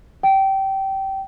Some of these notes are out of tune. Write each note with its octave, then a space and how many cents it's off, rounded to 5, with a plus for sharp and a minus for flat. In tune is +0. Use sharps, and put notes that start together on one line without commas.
G5 -20